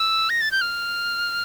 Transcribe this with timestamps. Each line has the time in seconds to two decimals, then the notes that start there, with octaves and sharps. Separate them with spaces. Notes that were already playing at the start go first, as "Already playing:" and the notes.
Already playing: E6
0.30 A#6
0.41 A6
0.51 G6
0.61 F6